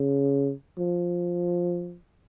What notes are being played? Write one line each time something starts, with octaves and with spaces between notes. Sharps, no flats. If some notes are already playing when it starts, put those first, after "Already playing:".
Already playing: C#3
F3